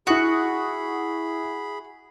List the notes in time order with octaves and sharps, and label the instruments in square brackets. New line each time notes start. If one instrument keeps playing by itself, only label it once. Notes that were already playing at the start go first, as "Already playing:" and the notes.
[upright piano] E4 D#6 [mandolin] F#4 [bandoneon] G#4 B5